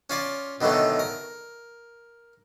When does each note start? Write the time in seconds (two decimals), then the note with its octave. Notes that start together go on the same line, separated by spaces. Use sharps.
0.10 C#4 F4 D5
0.61 B2 D3 D#3 F#3 A3
0.99 A#4